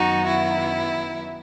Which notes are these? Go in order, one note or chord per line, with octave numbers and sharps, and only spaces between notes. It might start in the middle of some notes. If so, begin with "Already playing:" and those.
Already playing: F#2 D#3 F#3 B3 D#4 F#4
E4